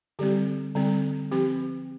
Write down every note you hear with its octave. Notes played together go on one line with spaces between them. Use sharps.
D3 G3 C4 G4
D3 G3 C4
F3 C4 G4